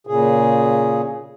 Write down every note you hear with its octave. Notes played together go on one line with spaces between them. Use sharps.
A#2 C#3 G#4